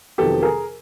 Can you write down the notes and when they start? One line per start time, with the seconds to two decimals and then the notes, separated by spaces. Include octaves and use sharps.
0.18 F2 C3 D#3 F#3 B3 G4 A4
0.43 G#4 A#4